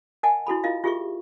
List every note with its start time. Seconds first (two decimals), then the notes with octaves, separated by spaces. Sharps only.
0.23 A#4 D#5 F#5 G#5 A5
0.47 E4 F#4 A4 B5
0.64 E4 F4 A#4 D#5 F5
0.84 F4 G4 G#4 A#4 E5 C#6